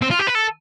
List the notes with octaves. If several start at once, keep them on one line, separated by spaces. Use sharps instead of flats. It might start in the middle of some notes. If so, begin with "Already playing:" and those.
C4
F4
G4
B4
A4